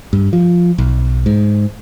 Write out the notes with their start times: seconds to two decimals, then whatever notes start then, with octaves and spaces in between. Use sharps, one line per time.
0.13 G2
0.33 F3
0.78 B1
1.26 G#2